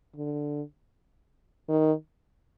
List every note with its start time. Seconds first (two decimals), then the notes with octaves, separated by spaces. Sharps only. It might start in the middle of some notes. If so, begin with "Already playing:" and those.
0.16 D3
1.69 D#3